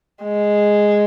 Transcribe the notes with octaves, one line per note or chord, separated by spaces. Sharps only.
G#3